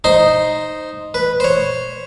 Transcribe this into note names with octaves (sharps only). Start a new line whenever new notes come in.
D#4 C5 C6
B4
C5 C#5